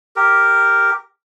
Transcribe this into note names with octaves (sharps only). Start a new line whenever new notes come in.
G4 A#4